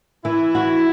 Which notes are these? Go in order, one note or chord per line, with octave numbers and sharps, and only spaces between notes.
E3 E4
F#4